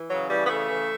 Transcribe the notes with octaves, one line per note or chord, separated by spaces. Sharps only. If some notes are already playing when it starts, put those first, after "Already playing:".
Already playing: E3
C#3 F#3
E3 G3
B3
C#3 A3
E3